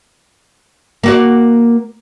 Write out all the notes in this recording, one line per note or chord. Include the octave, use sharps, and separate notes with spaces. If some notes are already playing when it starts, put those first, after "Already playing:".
A#3 F#4 D5